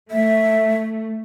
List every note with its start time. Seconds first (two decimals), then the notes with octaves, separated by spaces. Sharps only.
0.11 A3 E5